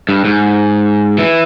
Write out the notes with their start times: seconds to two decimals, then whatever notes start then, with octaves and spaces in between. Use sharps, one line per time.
0.09 G2
0.25 G#2
1.18 E3